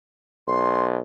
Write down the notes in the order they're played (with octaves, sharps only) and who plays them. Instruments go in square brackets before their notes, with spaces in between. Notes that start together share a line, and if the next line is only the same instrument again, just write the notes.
[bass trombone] B1 [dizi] C6